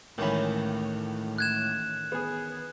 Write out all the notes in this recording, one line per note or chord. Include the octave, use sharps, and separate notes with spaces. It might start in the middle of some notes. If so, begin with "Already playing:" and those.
C#2 A2 D#3 E3 C#4 B5
F#6 G#6 E7
B3 G#4